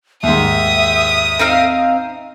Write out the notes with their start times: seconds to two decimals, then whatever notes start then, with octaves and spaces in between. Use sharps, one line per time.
0.23 D#2 G#2 E5 D#6
1.39 C4 D#4 F5